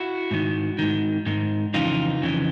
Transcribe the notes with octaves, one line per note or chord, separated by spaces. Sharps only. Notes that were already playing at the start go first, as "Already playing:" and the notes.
Already playing: E4 F#4
G#2 D#3
G#2 D#3
G#2 D#3
F2 C#3 E3 D#4 F4
F2 C#3 E3